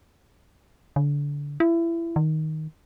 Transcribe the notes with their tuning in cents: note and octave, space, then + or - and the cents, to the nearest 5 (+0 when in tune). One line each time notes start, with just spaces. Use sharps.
D3 -25
E4 +25
D#3 +5